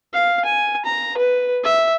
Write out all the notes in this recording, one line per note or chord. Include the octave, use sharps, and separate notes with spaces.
F5
G#5
A#5
B4
E5